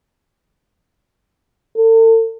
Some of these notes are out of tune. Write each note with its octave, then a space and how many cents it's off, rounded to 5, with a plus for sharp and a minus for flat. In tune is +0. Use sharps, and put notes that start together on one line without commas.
A4 +40